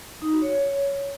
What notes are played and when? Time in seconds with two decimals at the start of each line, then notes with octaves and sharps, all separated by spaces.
0.22 D#4
0.32 F#4
0.42 C#5